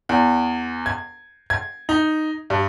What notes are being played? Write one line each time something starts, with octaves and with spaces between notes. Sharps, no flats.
E2
G#6
G#6
D#4
G2